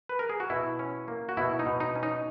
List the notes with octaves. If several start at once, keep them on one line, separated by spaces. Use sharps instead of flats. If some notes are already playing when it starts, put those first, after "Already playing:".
B4
A#4
G#4
F#4
B2 E4
C#4
A#3
F#4
B2 E4
D#4
B2
D#4
C#4
D#4